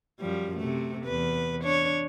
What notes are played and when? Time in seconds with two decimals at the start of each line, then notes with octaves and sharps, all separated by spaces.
0.19 F#2 F3 G3
0.57 C3 A3
1.05 E2 B4
1.62 D4 C#5